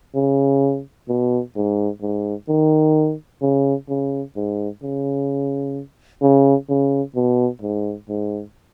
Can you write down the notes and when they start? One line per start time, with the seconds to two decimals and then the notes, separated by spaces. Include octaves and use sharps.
0.15 C#3
1.08 B2
1.56 G#2
2.02 G#2
2.48 D#3
3.42 C#3
3.89 C#3
4.36 G#2
4.83 C#3
6.22 C#3
6.69 C#3
7.15 B2
7.62 G#2
8.09 G#2